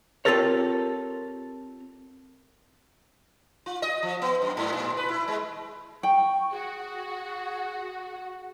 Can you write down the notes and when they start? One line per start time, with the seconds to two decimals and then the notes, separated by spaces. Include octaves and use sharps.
0.25 C4 F4 G4 A4 A#4 C#5
3.66 F4
3.82 D#5
4.03 F3
4.22 B3
4.42 F#2
4.57 G#2
4.73 A#2
4.97 B4
5.09 E4
5.28 G#3
6.03 G5 C#6
6.51 F#4 G#4